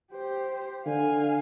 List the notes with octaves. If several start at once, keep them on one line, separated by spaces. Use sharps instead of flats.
G4 C5
D3 F5 G#5